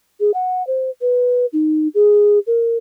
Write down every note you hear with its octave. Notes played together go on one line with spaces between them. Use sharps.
G#4
F#5
C5
B4
D#4
G#4
A#4